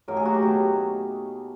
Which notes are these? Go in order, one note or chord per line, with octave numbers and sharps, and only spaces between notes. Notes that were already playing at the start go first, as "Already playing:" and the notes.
A2 F#3 A#3 D#4 A#4
G#4
F#4
G4
B2 F#3 A3 F#4